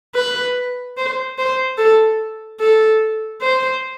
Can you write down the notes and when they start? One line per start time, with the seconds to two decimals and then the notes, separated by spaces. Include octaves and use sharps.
0.15 B4
0.98 C5
1.38 C5
1.78 A4
2.60 A4
3.42 C5